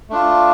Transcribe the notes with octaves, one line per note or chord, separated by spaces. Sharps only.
A3 D4 F4